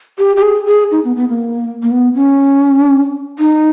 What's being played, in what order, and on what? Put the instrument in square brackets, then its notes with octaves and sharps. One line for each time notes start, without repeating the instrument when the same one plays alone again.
[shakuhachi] G4
G4
G#4
G#4
D#4
B3
B3
A#3
A#3
B3
C#4
D#4